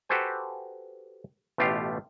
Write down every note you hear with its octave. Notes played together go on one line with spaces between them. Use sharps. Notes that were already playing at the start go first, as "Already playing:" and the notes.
F#4 G4 A4 B4 C5 G#5
A1 B2 A3 F4 G4 F5